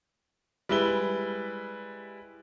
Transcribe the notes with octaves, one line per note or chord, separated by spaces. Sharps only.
G3 G#3 E4 B4 G7